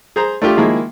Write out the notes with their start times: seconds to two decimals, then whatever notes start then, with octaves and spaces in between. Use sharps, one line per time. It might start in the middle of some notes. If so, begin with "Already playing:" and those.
0.16 G#4 C5 A#5
0.42 A3 D4 F4 G4
0.57 D#3 F3 G#3 A#3 E4 G#4